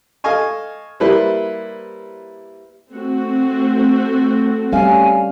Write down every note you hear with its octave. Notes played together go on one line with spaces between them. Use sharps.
A4 D#5 F5 G#5 C#6
G3 A#3 E4 B4 C5
A3 C4 F#4
G3 C#4 F5 G#5